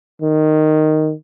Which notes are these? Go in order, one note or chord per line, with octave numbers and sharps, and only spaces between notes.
D#3